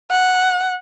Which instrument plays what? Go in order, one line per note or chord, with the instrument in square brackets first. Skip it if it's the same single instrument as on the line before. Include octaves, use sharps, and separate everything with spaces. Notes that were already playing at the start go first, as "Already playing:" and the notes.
[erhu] F#5